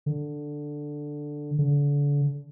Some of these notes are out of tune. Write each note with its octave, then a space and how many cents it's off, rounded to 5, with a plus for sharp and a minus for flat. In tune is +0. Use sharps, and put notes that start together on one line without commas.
D3 +5
D3 -35